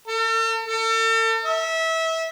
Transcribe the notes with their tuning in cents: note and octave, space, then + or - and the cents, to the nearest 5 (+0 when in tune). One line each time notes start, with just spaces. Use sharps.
A4 +45
A4 +40
E5 -25